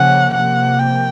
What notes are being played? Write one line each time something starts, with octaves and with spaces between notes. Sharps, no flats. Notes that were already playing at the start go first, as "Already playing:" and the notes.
Already playing: C#3 F3 A#3 C#4 F#5
C3 F3 A#3 F#5
G5